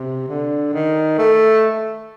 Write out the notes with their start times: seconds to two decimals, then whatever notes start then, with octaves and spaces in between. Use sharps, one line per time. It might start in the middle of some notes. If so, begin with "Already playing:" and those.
Already playing: C3
0.28 D3
0.73 D#3
1.18 A3